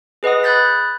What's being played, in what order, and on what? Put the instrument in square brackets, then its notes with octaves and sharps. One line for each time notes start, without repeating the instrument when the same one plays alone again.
[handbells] G#4 B4 D#5 F#5 D#6
B5 D#6 F#6 G6 A6 B6